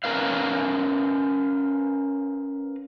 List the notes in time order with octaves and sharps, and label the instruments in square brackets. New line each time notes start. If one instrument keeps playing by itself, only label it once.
[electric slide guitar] C#4 A#4 B4 F5